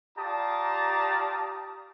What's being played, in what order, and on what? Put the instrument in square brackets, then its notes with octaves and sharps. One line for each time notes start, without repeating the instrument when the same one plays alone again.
[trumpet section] F4 G4 D5 A5 A#5 D#6